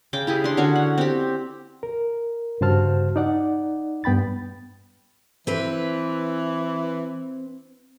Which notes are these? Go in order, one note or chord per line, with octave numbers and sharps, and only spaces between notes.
C#3 G5 D6
E4 G4 G#4
D4 C6
D3 C#4 F#4 C#5
F#5
C4 G4
A#4
G2 C#3 F#4 C5 A5 F6
D#4 D5 F#5
G2 B3 G5 B5 A6
E3 C4 B4